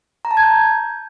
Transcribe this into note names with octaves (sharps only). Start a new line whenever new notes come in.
A#5
A5
G#6
G6